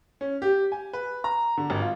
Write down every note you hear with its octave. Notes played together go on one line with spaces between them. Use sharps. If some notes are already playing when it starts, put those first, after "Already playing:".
C#4
G4
G#5
B4
A#5
D3
G#1
F4